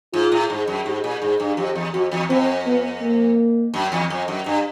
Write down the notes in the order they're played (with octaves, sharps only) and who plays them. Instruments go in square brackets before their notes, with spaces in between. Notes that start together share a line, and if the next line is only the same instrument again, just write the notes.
[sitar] G#2 [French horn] F4
[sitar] A2
G#2
F#2
[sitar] G#2 [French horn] G4
[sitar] A#2
[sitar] G#2 [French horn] G#4
[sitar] G2
[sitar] F2 [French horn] G4
[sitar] E2
[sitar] F2 [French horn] F#4
[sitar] E2
[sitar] F2 [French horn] C4
[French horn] B3
A#3
[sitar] F#2
E2
F2
F#2
G2